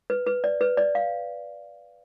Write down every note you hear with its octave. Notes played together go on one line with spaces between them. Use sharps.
B4
B4
D5
B4
D5
F5